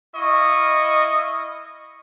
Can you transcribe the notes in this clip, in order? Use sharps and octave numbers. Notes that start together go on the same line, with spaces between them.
E4 D#5 F5 C#6